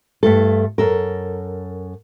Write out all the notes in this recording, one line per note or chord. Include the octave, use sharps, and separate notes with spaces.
G2 A3 A4
F#2 A4 A#4